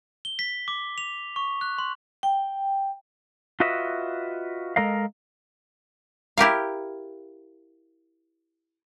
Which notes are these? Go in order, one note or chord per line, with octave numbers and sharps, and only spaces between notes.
G7
B6
D6
F7
C#6
F#6
C6
G5
F4 F#4 B4 D#5 E5
G#3 A4 A#4 D#5 F5
E4 G4 A#4 F5